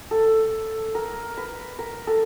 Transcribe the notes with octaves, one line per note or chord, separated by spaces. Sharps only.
A4
A#4
B4
A#4
A4